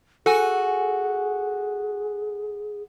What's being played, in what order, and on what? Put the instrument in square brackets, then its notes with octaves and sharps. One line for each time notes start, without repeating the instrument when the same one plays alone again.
[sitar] F#4 [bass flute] G#4 [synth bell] A4 G#5